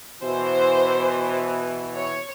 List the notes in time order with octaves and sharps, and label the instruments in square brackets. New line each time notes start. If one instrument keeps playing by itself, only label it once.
[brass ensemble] B2 E3 [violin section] C5
[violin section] C#5